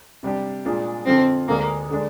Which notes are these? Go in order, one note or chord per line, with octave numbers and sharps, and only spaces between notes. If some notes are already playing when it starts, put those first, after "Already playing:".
C3 G3 D4 G4
A#2 G#3 D4 F4
F2 D3 F3 C4
D2 D3 G#3 A#3
D3 G#3 D4